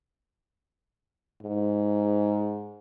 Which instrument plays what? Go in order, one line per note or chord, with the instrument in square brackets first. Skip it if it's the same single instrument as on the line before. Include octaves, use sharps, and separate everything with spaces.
[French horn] G#2